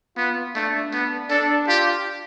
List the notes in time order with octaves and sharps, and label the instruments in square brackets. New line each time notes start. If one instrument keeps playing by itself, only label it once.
[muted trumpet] B3 [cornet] F4
[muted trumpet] A3 [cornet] D4
[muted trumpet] B3
[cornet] D4 [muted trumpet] A4
[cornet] F4 [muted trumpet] G4